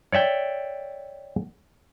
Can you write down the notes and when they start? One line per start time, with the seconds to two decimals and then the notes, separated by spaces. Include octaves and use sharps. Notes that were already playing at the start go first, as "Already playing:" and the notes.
0.12 C#5 D5 E5 G5